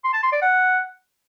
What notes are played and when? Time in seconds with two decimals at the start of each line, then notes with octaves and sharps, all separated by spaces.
0.04 C6
0.13 A5
0.23 C6
0.32 D5
0.42 F#5